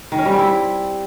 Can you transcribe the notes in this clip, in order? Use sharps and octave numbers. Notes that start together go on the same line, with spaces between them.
D#3
C#4
G3
C4
E4